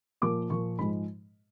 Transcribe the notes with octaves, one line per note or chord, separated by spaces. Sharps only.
A#2 F3 A#3 D6
A#2 F3 A#3 C#6
G#2 F3 G#3 B5